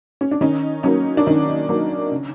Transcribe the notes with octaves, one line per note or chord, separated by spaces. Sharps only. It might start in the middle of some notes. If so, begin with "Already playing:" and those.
C#4
D4
D#3 C#4 D#4
F#3 A#3 C#4 D#4
D4
D#3 C#4 D#4
F#3 A#3
C#3